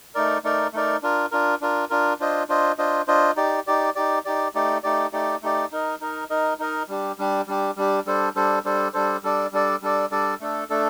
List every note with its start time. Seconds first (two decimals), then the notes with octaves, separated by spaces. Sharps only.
0.15 A3 D#4 A#4 D5
0.44 A3 D#4 A#4 D5
0.73 A3 D#4 A#4 D5
1.02 D4 F4 A#4
1.32 D4 F4 A#4
1.61 D4 F4 A#4
1.90 D4 F4 A#4
2.20 D4 F4 C5 D#5
2.49 D4 F4 C5 D#5
2.78 D4 F4 C5 D#5
3.08 D4 F4 C5 D#5
3.36 D#4 G4 D5
3.67 D#4 G4 D5
3.95 D#4 G4 D5
4.25 D#4 G4 D5
4.55 A3 D#4 G4 D5
4.83 A3 D#4 G4 D5
5.13 A3 D#4 G4 D5
5.42 A3 D#4 G4 D5
5.72 D#4 A#4 D#5
6.01 D#4 A#4 D#5
6.30 D#4 A#4 D#5
6.59 D#4 A#4 D#5
6.88 G3 D4 G4
7.18 G3 D4 G4
7.47 G3 D4 G4
7.77 G3 D4 G4
8.06 G3 D4 A4 C5
8.35 G3 D4 A4 C5
8.65 G3 D4 A4 C5
8.94 G3 D4 A4 C5
9.23 G3 D4 A4 D5
9.52 G3 D4 A4 D5
9.82 G3 D4 A4 D5
10.11 G3 D4 A4 D5
10.40 A3 D4 A4
10.70 A3 D4 A4